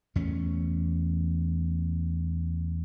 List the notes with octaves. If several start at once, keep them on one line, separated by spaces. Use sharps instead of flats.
E2 A3 C#4